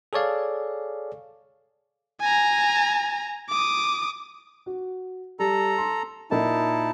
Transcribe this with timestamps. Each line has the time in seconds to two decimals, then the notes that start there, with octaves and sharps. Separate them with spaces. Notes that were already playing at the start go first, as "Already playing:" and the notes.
0.13 G#4 A4 C#5 D5 F5
2.21 G#5 A#5
3.50 D6 D#6
4.66 F#4
5.40 G3 A4 A#5
5.78 C6
6.31 A#2 D#4 E4 A#4 D#5 A5